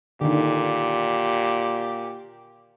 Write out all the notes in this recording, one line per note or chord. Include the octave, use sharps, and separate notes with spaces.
A#2 D3 D#3 G4